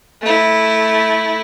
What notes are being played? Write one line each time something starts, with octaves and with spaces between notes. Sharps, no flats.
A3 E4